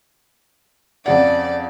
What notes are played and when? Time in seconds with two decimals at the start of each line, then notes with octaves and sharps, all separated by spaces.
1.06 F2 C#3 D5 F#5